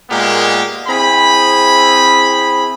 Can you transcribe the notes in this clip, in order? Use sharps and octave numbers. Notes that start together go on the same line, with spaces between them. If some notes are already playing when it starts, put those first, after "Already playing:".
A#2 G#3 A#3 B3 G4
C4 E4 G#4 B5